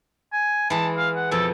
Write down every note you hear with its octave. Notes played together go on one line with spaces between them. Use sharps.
G#5
E3 G#3 A5
F5
F#5
F2 B2 A4